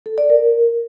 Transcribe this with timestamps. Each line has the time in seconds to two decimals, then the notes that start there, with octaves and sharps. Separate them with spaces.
0.06 A4
0.18 D5
0.30 A#4